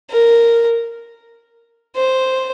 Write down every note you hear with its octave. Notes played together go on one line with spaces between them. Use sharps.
A#4
C5